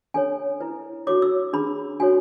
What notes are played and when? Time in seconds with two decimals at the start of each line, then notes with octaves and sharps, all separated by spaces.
0.14 D4 A4 C#5 G#5
0.60 E4 B4
1.07 D4 F#4 A4 C#5 D6
1.22 E6
1.53 D4 G#4 B4 B5
2.00 D4 F#4 A4 C#5 G#5